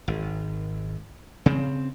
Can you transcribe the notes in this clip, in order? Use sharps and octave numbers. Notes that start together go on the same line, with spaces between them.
G#1
C#3 C4